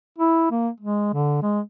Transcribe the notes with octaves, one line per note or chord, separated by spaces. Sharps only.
E4
A#3
G#3
D3
G#3